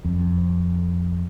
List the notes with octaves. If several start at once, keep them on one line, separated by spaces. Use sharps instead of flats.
F2